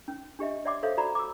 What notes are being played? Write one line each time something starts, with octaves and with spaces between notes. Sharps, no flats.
C#4
D4 G4 D#5 E5
C#5 D5 E5 F#5 C6 D6
A4 C5 C#5 E5 F5
F#4 D5 A#5 B5
D6 E6